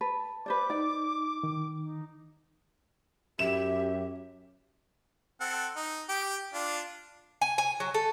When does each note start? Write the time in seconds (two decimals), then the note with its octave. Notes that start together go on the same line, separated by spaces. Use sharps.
0.01 B4 A5
0.46 B4 C5 D5 D6
0.70 D#4 D5
1.43 D#3
1.80 D#4
3.39 F#2 G4 E5 E7
5.41 C4 A4 F#5
5.76 D#4
6.09 G4 G5
6.54 D4 F4
7.42 G#5
7.58 G#5
7.80 F#3
7.94 A4